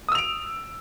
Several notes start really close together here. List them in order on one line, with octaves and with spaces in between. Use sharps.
D#6 E6 F7 D7